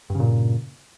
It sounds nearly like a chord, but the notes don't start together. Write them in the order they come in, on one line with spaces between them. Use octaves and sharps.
G2 C#3 A#2